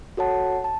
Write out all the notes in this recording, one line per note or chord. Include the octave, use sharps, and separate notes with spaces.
F#4 A4 C#5 F#5 A5
A5